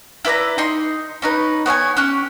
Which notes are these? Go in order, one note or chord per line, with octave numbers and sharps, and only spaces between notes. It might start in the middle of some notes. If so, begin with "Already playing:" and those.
E4 B4 D5 A#5
D#4 C6
C#4 D#4 B4
B3 C#5 F#5 G#5
C#4 G4 F#6